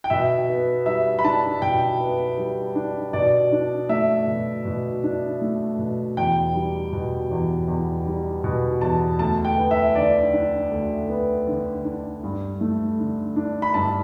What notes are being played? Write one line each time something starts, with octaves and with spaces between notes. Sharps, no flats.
G5
B2 E5
B3
G3 E5
B5
D4 A5
B2 G5
B3
G3
D4
B2 D5
D4
A3 E5
B2
B2
D4
A3
B2
E2 G5
G3
B2
E2
E2
G3
B2
E2 A5
D2 A5
G5
B3
E5
D3 D5
D4
D2
B3
D3
D4
G2
A3
D3
D4
B5
G2 A5